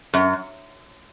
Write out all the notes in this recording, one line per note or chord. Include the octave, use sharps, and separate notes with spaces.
F#2